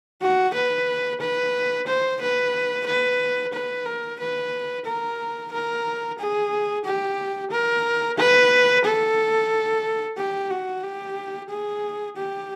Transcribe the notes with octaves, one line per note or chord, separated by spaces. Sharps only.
F#4
B4
B4
C5
B4
B4
B4
A#4
B4
A#4
A#4
G#4
G4
A#4
B4
A4
G4
F#4
G4
G#4
G4